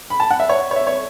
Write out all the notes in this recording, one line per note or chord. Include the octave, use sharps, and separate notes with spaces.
B5
A5
F#5
E5
C#5
C#5
E5
C#5